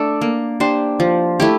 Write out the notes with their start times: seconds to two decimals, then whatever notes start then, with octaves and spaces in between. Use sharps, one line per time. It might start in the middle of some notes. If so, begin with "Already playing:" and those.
Already playing: A3 D4 A4 D5
0.21 A#3
0.60 D4 G4 C5
1.00 F3
1.40 A3 E4 G4